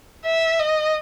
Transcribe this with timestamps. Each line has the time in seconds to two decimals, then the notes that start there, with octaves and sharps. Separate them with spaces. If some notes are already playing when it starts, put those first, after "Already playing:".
0.25 E5
0.60 D#5